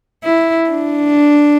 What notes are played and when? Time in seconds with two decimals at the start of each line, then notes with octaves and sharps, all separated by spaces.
0.23 E4
0.70 D4